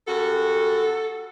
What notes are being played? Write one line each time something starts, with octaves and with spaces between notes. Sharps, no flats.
F#2 G3 F#4 A4